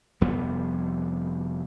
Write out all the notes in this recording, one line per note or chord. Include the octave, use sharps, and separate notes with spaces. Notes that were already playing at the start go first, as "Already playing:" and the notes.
F1 F2 G3 B3